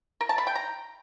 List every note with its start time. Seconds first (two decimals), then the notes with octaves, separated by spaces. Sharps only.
0.21 A#4
0.29 A5
0.38 B5
0.47 G5
0.55 A#5